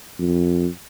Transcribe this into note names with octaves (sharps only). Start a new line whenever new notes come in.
F2